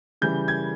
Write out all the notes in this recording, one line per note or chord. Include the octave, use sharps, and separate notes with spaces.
C#3 E3 G3 G6
G#6